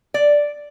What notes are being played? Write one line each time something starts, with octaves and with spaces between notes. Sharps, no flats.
D5